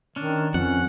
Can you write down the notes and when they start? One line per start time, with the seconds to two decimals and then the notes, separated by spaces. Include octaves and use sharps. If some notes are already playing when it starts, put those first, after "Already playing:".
0.16 D#3 C#4 D4
0.54 F2 C#4 F#5